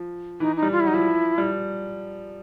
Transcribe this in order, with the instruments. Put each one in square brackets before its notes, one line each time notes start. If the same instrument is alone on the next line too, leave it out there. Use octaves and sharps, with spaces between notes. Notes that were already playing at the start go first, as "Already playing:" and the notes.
Already playing: [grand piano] F3
[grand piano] E3 [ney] D#4
[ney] D#4
[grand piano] G3
[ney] F4
E4
[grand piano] F#3 [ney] D#4
[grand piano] F3 [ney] E4
[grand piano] G3